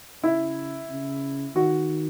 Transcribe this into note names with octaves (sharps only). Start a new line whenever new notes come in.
C#3 E4
C#3
D#3 F#4